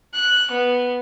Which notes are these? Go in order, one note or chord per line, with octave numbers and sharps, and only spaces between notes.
F#6
B3